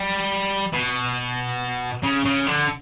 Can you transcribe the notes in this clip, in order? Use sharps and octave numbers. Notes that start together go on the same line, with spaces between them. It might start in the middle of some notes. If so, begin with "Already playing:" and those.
Already playing: G3
B2
C#3
C#3
D3